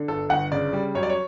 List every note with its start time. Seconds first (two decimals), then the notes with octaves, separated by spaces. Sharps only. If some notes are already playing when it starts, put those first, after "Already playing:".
Already playing: D3
0.08 G1 A4
0.29 G1 F#5
0.52 C#3 D5
0.73 G3
0.95 F#2 C#5
1.03 D5
1.09 C#5